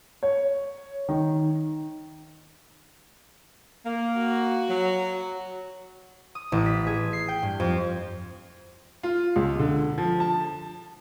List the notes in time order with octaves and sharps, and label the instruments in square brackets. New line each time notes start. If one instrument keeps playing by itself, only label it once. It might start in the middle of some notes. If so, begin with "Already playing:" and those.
[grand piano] C#5
D#3
[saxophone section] A#3
[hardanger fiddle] F#4
[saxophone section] F#3
[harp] D#6
A1
B6
G#4
C7
G5
G2
F2
[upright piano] F4
C#2
D3
F3
A5